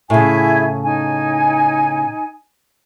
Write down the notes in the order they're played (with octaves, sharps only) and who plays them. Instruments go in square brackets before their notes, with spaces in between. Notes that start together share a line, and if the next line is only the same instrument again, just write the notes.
[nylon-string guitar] A2 C#3 [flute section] E4 G#4 G#5
[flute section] D#4 G#5